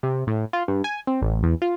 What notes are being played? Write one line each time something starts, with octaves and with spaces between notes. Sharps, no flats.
C3
A2
F4
G2
G#5
C4
A1
E2
F4